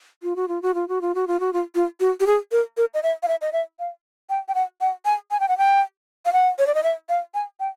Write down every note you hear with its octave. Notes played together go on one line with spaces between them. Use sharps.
F4
F#4
F4
F#4
F4
F#4
F4
F#4
F4
F#4
F4
F4
F#4
G4
G#4
A#4
A#4
D#5
E5
F5
E5
D#5
E5
F5
G5
G5
F#5
F#5
G#5
G#5
G5
F#5
G5
F5
F#5
C#5
D5
D#5
E5
F5
G#5
G5